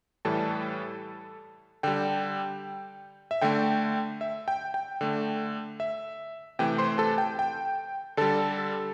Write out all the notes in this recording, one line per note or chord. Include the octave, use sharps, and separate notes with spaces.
A2 E3 G3 A4 A5
D3 G3 G5
E5
D3 A3 G5
E5
G5
G5
D3 A3
E5
C3 E3 A3 G5
C5 C6
A4 A5
G5
G5
D3 G3 A4 A5